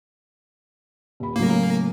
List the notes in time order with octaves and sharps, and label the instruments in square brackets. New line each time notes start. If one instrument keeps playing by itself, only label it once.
[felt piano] D#1 B5
[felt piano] A2 C#3 F#3 [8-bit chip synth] A#3